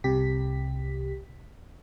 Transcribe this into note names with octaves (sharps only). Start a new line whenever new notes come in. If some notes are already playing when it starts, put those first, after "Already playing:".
C2 C3 G4 B6